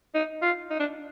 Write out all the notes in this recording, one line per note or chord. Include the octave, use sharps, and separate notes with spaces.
D#4
F4
D#4
D4